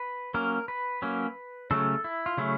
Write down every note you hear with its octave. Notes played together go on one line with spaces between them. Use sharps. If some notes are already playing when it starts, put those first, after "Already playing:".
Already playing: B4
F#3 A#3 C#4 A#4
B4
F#3 A#3 C#4
C#3 F#3 A3 C#4 A4
E4
F4
C#3 F#3 A3 C#4 E4